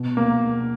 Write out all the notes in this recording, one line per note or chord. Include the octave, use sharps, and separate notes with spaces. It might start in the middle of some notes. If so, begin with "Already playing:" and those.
Already playing: B2
A#3